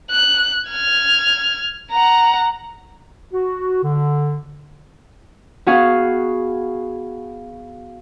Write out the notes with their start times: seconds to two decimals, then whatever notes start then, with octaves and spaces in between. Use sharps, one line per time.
0.11 F#6
0.70 F6 G#6
1.91 F#5 A#5
3.33 F#4
3.83 D3
5.66 B3 F#4 G#4 F5